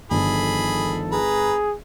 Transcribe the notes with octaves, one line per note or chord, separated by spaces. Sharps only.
G1 D#3 F3 G#4 A4 B5
G#4 B4 A#5